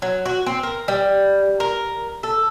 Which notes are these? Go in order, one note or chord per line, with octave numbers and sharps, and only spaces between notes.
F#3
F#4
C4
A#4
G3
A#4
A4